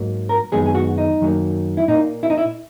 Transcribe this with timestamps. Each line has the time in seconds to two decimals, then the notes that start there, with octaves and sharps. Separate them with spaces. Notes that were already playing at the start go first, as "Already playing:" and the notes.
Already playing: G#2 F#3 A#3
0.29 A#4
0.52 F#2 D#3 G#3 B3 G#4
0.66 G#4
0.75 F#4
0.98 D#4
1.21 F#2 D#3 F#3 A#3
1.77 E4
1.88 A#2 A#3 D#4
2.23 E4
2.30 D#4
2.38 E4